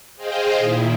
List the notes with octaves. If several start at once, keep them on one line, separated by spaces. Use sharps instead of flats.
G#4 C5 D#5 F5 G5
A#2 D#3 E4